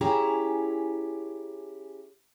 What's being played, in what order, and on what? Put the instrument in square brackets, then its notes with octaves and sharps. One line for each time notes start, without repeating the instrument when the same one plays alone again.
[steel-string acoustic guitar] C#4 E4 G4 G#4 A#5